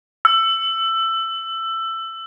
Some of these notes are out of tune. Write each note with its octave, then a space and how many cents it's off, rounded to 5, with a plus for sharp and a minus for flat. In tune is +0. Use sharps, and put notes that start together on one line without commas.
E6 +20